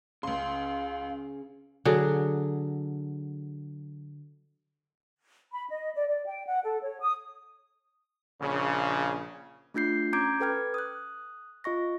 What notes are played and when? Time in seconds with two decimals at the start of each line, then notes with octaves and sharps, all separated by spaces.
0.23 C#2 C#3 F5 C6
1.85 D3 F#3 G#4
5.52 B5
5.69 D#5
5.95 D5
6.08 D5
6.26 G5
6.46 F#5
6.64 A4
6.82 C#5
7.01 D#6
8.41 A#1 C#3
9.74 A3 D4 F4 G6 C7
10.13 C#4 A#5 D6 G6 G#6 D7
10.40 A4 B4 G5 F6 G#6
10.74 D#6 F#6
11.64 F4 D#5 C#6 A#6